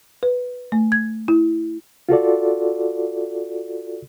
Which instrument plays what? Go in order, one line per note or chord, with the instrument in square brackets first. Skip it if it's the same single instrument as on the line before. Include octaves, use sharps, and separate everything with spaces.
[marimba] B4
A3
G#6
E4
[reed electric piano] F4 F#4 A4 D5